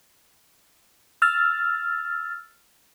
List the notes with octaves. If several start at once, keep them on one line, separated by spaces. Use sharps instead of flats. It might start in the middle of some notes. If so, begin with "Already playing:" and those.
E6 F6 A6